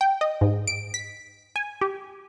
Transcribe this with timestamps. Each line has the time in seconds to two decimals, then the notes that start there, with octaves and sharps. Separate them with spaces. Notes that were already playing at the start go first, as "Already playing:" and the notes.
0.01 G5
0.21 D#5
0.41 G#2
0.67 D7
0.94 B6
1.56 G#5
1.81 G4